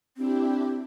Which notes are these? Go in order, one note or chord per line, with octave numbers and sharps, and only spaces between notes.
C4 D4 E4 G4